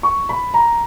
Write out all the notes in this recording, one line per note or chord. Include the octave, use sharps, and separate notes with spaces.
C#6
B5
A#5